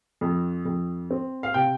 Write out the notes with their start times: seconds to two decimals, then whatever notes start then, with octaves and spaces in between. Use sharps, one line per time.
0.21 F2
0.65 F2
1.11 C4
1.43 F5
1.54 C3 G5